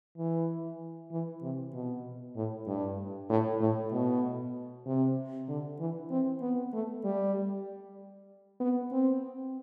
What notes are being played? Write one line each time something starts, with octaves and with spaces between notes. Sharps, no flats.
E3
E3
C3
B2
A2
G2
A2
A2
B2
C3
D3
E3
C4
B3
A3
G3
B3
C4